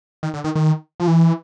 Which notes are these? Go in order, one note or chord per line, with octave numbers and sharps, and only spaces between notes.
D#3
D3
D#3
D#3
F3
E3